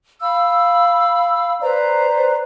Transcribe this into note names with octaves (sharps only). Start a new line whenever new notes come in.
F5 B5 E6
B4 C5 D5 A#5